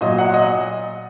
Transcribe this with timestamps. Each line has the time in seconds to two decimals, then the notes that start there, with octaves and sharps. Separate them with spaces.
0.01 A#2 F#3 D#5
0.18 F#5
0.34 D#5